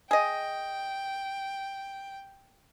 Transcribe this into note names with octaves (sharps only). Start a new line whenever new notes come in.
G#4 D#5 G5